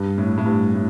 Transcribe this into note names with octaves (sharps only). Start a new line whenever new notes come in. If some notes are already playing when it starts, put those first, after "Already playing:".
Already playing: G2
A2
A2
G2
A2